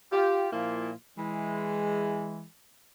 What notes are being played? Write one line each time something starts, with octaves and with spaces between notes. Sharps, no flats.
F4 G4
A#2 F3 A#3 E4 F4
E3 G#3